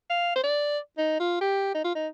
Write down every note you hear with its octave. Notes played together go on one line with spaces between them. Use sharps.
F5
C5
D5
D#4
F4
G4
D#4
F4
D#4